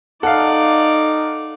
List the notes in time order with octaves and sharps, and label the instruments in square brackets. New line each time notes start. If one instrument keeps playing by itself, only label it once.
[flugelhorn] D#4 [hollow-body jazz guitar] A4 [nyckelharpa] D5 [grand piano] F5 F#5